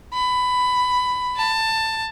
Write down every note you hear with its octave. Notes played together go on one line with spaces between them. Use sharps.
B5
A5